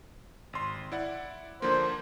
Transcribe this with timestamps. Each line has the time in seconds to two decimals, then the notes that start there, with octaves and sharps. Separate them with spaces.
0.53 G#1 C6
0.92 E4 D5 F#5
1.62 D3 F3 A#3 C5